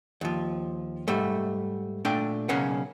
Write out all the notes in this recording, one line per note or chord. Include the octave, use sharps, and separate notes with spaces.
D#2 F3
G#2 G3 A3
A#2 A3 D4 G5
B1 C#3 A#3 C#4 F#5